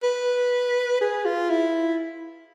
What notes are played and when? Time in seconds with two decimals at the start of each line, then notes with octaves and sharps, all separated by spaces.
0.03 B4
1.01 G#4
1.25 F4
1.50 E4